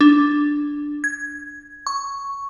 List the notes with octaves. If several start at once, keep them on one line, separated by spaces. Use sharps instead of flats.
D4
G#6
C#6